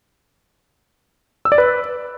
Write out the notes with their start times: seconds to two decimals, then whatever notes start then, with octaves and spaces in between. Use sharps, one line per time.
1.45 E6
1.52 D5
1.58 B4